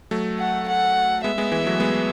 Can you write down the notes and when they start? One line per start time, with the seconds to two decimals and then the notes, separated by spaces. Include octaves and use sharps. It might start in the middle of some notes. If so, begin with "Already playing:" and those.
0.11 F#3 A3
0.39 F#5
0.68 F#5
1.24 G#3 B3 E5
1.38 G#3 B3
1.52 E3 G#3
1.66 F#3 A3
1.80 G#3 B3